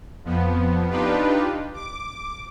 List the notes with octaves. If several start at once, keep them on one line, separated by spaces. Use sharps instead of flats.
F2 F3 B3
D4 D#4 F4 G4 B4
D6